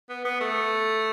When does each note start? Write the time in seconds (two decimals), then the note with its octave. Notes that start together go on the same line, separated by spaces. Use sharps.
0.09 B3
0.25 B3
0.41 A3